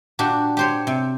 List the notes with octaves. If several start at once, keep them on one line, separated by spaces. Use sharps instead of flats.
A#2 D4 F#4 G4
G4 C5 C#5
C3